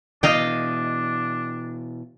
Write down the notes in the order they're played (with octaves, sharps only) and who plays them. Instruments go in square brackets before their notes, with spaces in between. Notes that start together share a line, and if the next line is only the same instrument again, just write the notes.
[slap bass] B2 E3 [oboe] D4 [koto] D#5 F5 G5